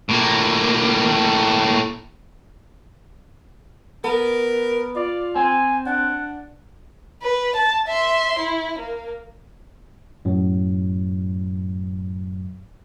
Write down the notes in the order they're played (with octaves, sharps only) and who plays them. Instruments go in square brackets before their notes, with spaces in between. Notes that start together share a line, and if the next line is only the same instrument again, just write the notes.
[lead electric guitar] A2 A#3
[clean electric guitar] B3 [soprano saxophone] A#4
[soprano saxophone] F4 [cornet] D5
[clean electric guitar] C4 [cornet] G#5
[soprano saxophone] D4 [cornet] F#5
[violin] B4
A5
E5 C6
E4
A#3
[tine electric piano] F#2 A2 F#3